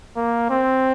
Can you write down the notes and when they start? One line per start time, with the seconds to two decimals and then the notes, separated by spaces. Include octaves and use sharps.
0.16 A#3
0.50 C4